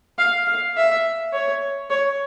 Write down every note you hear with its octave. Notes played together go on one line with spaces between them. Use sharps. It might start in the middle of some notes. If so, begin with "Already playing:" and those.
F5
F5
E5
C#5
C#5